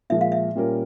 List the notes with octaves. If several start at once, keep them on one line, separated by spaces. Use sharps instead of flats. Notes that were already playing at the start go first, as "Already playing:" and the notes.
A#2 F3 G#3 E5
F5
E5
A#2 G3 C#4 F4 A#4